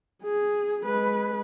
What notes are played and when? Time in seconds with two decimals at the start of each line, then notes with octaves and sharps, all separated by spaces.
0.23 G#4
0.84 G#3 B4